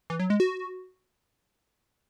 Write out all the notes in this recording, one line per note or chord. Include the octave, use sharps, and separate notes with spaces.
E3
F#3
G#3
F#4